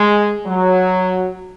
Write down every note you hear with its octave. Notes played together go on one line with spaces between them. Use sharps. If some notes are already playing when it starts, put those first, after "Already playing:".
Already playing: G#3
F#3